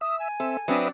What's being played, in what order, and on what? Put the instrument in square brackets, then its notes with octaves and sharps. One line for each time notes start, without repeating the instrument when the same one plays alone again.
[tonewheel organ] E5 [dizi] D#6
[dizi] G#5
[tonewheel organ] C4 E5 [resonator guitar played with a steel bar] A4
[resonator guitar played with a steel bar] F#3 C4 D4 [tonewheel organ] B4 E5 D#6